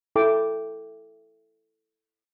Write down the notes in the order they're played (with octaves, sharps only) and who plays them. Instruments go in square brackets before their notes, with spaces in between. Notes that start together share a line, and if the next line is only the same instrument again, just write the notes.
[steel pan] E4 A4 G5 A5 D6